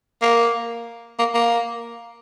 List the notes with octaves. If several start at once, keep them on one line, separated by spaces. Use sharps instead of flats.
A#3
A#3
A#3